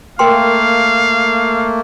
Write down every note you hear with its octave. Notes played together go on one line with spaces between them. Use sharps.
A3 A#3 A#4 F5 G5 C6